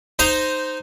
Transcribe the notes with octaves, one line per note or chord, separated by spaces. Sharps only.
D#4 C5 A#5 D#6